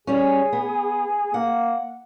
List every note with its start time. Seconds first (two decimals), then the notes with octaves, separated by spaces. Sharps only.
0.07 G3 C#4 G#4
0.53 B3
1.34 A#3 F#5